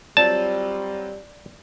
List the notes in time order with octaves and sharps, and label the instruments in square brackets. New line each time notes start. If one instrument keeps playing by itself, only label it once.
[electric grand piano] F#3 C4 F4 [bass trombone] G3 [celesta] D5 [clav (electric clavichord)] A5